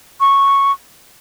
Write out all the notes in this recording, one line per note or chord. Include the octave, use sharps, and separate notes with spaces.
C#6